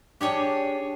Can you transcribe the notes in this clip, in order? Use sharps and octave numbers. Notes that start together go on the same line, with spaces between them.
D4 G4 G#4 C#5